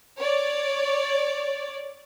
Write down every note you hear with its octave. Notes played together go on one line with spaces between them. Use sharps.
C#5 D5